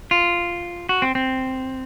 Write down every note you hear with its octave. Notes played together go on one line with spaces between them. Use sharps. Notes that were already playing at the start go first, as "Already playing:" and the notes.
F4
F#4
C4
C4